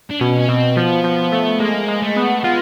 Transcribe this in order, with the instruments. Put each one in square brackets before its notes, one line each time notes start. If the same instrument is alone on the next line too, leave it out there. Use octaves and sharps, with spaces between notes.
[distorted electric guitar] D4
[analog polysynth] B2 [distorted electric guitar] C#4
[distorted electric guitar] C#4
[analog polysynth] B2 [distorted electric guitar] C4
[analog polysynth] F3 [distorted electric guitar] B3
[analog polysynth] F3
A3
[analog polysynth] G#3 [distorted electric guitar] A#3
[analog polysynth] G#3
[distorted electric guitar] A3
[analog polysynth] B3
[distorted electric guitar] G#3 [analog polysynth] F4